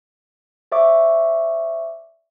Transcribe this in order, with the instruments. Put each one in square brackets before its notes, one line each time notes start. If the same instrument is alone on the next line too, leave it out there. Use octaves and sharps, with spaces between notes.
[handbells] C5 D5 E5 C#6 D6